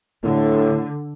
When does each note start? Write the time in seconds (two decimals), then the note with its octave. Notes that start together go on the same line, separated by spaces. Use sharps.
0.24 A2 D3